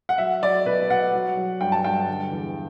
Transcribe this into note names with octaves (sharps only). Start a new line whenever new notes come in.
F#5
F#3 E5
F#3 D5
B2 B4
B2 F#5
F#3
F#3
G2 G5
A5
G2 G5
D3
E2